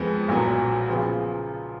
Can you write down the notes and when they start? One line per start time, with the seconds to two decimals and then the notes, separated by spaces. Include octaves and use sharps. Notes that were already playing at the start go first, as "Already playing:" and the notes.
Already playing: F2 F3 G#3 B3
0.28 B1 A#2 F#3 B3
0.89 C#3 F3 B3 F4